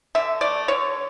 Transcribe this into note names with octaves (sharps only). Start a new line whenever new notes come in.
D3 E5
A3 D5
D3 C#5